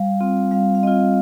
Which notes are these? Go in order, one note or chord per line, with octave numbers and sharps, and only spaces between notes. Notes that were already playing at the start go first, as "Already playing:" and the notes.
Already playing: G3 F5
C4 F4
G3 F5
F5
C4 F4 D#5